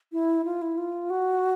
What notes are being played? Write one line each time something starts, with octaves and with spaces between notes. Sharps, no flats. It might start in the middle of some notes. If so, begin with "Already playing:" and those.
E4
F4
E4
F4
F#4